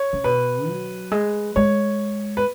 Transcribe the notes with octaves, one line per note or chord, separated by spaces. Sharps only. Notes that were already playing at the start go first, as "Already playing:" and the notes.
Already playing: C#5
C#3
B2 B4
F#3
G#3
G#3 C#5
B4